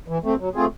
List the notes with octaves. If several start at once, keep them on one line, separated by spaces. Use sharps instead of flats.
E3
A3 C4
F#3
A3 C4 F4 G#4